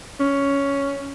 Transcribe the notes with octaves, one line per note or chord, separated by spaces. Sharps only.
C#4